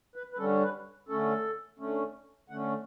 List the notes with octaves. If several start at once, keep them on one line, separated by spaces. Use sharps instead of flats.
B4
B4
D3 G3 C#4 A4
B4
D3 A3 C#4 A4
D3 A3 C#4
D3 A3 C#4 F#5